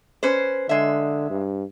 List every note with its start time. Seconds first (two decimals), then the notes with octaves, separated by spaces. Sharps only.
0.23 C#4 B4 C5
0.69 D3 G#3 E5
1.30 G2